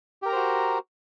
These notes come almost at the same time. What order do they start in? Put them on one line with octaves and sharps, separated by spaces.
G4 A#4 A#5 C5 F#4